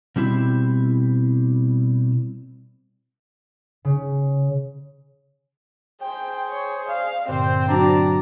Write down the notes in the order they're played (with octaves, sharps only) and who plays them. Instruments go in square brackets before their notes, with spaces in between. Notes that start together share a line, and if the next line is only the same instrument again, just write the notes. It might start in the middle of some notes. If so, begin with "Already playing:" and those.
[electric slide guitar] B2 G3 C4 E4
[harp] C#3
[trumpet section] G#4 C5 [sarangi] G5
[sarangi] C#5
[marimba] D5 [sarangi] F5
[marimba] G2 A#2 D3 [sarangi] C4 [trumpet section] C5
[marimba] F#3 F#4 [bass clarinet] D4 [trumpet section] D5 A#5